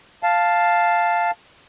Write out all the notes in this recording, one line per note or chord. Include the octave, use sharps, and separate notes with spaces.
F5 A5